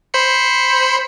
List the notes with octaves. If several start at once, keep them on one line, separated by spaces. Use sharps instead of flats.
C5 B5 C#7